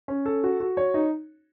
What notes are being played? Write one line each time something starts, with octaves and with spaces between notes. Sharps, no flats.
C#4
A4
F#4
F#4
C#5
D#4